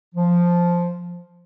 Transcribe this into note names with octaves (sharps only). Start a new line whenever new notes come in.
F3